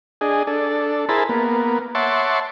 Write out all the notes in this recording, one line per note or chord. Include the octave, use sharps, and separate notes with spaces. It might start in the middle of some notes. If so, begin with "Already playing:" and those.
D4 G#4 D#5
D4 A4
E4 G#4 A#4 C5 A5 B5
A#3 B3
C#5 E5 F#5 A5 C6 D6